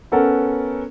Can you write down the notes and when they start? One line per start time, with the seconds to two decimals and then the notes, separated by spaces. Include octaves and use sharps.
0.12 B3 C#4 A4 A#4 F#5